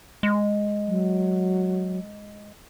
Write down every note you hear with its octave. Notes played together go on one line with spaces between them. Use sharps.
G#3
F#3